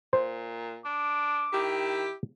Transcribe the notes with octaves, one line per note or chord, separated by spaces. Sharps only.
A#2 C5
D4 D6
D#3 E4 G4